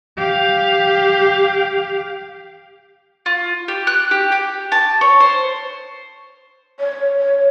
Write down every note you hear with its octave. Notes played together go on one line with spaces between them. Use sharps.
G4 F5
F4
G4
F#6
G4
G4
A5
C#5
C5
C#5